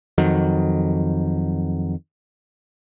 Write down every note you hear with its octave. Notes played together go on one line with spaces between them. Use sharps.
F2 D#3 F#3